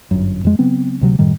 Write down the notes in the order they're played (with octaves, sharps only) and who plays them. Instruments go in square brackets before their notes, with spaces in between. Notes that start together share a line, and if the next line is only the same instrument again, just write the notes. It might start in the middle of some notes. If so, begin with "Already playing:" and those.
[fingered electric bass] G1 F#2
F2 G#3
C#3 F#3 B3 C4
D2 C3 F#3
F#2 A2 D#3 G3